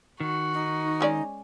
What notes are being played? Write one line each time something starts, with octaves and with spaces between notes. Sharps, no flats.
D#3 F#4
D#4
G#3 C#4 D5